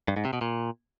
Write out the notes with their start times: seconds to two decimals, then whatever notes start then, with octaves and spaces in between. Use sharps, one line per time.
0.08 G2
0.16 G#2
0.25 C3
0.33 B2
0.41 A#2